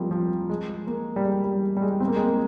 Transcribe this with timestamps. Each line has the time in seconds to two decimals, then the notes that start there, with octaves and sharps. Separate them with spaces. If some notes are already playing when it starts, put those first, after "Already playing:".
Already playing: F3 G3 G#3 A#3 C4
0.11 F3
0.50 G#3
0.87 A#3
1.16 G3
1.25 G#3
1.44 G3
1.77 G3
1.82 G#3
2.00 C4
2.08 A#3
2.16 G#3
2.23 A#3